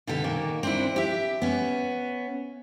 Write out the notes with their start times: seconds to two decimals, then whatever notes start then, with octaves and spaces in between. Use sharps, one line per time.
0.07 B2 D3 G4 A4
0.24 A#2 D#3 A#3
0.63 C4 D4 E4
0.96 G4 E5
1.42 B3 C#4